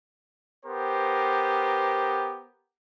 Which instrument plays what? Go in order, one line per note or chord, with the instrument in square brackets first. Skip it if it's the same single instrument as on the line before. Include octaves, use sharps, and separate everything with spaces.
[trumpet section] B3 G4 A#4 C5